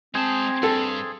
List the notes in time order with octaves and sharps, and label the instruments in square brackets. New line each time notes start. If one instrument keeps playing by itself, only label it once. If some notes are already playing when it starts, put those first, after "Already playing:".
[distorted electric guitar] G#3 A5 [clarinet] C4 [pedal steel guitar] G#4 C5
[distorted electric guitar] G2 [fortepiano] A4